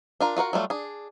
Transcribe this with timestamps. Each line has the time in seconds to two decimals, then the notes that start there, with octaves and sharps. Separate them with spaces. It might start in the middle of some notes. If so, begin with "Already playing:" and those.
0.20 D4 F4 A#4
0.36 F4 F#4 A#4 F#5
0.53 F#3 G3 A3 F4
0.70 D4 G#4